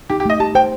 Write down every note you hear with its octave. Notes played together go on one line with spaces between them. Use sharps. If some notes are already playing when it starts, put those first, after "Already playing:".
D#4 G4
G4
A3 D#5
G4 A5
C5 G5